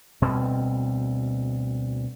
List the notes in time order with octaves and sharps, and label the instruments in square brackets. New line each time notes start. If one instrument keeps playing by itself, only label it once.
[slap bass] D2 B2 G3 C4